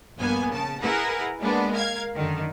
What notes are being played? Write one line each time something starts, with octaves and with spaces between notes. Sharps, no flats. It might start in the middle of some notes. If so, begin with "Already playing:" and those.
A#1 G2 A#3 B3 G#5
C#3 A5
E4 G#4 A#4 B4 F#5
G#3 A#3 B3 D4
A#4 F5 G#6
F#2 D3 D#3